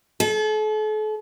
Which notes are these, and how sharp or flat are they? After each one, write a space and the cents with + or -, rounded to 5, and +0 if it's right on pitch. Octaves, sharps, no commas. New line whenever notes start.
A4 -40